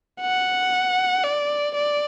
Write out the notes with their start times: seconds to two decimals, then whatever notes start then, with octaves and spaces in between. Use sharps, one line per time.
0.21 F#5
1.24 D5
1.75 D5